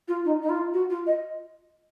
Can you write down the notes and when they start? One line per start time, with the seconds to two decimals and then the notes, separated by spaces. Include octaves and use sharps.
0.08 F4
0.25 D#4
0.42 D#4
0.49 F4
0.74 F#4
0.90 F4
1.07 D#5